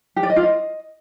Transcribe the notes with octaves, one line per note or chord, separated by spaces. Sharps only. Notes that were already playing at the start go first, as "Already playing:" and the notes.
G4
D5
D#5
F4
D#5